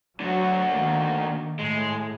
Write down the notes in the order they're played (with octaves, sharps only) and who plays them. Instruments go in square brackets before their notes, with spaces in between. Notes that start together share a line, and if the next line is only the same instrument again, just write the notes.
[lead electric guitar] D3 F#4 [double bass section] F#3
[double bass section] D#3 A#3
[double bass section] A2 [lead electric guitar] G#3